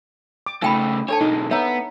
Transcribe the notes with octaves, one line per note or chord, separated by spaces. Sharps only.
D6
C#3 A3 D#4 G5 B5
D4 A4 C#5 A5
B1 G#3 D#4
B3 C#5 E5 A#5